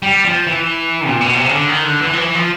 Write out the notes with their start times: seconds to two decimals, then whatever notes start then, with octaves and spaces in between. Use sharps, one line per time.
0.02 G3
0.25 F3
0.47 E3
1.08 A#2
1.21 B2
1.35 C3
1.46 C#3
1.52 D3
1.68 D#3
1.85 D3
2.01 E3
2.13 F3
2.19 E3
2.35 F3